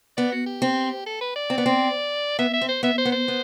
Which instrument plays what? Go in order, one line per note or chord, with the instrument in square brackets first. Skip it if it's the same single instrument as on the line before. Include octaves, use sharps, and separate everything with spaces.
[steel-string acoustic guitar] B3 [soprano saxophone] D5
[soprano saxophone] F#4
G4
[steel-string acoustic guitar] C4
[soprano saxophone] A4
B4
D5
[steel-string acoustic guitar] C4
B3
C4
[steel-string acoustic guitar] B3 [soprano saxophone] E5
[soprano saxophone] E5
[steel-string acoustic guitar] C4
[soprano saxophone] C5
[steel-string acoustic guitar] B3 [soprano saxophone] E5
[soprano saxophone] C5
[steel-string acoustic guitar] B3
[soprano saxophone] C5
[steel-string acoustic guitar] B3